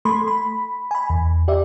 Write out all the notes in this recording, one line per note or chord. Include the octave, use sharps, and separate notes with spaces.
A3 A4 B5 C6
B5
G#5 B5
E2
G4 D5 E5